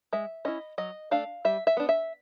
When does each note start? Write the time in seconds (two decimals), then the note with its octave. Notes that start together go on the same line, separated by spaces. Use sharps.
0.13 G#3 E5
0.45 C#4 E4 D#5
0.78 F#3 D#5
1.11 A3 D4 F5
1.45 G3 E5
1.67 E5
1.77 B3 D4
1.89 E5